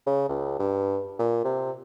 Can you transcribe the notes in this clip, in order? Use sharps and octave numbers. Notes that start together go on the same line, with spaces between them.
C#3
C#2
G2
A#2
C3